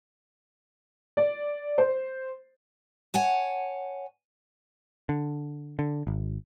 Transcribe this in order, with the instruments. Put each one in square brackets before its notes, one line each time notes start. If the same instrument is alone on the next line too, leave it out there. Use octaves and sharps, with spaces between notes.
[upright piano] D5
C5
[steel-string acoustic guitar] C#5 F#5 G#5 A5
[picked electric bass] D3
D3
G#1